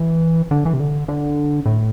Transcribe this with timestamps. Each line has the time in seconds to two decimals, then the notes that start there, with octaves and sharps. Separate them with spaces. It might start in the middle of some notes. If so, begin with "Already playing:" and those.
Already playing: E3
0.51 D3
0.65 E3
0.74 C3
0.80 D3
1.08 D3
1.66 A2